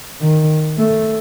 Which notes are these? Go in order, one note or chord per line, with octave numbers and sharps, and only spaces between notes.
D#3
A3